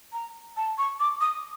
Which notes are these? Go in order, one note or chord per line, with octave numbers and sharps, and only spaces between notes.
A#5
A5
C#6
D6
D#6